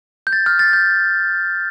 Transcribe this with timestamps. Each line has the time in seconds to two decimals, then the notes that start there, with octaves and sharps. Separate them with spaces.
0.27 G6
0.33 A6
0.46 F6
0.59 A6
0.73 G6